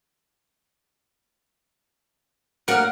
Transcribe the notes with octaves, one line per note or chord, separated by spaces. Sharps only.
D2 A#3 A#4 F#5 F6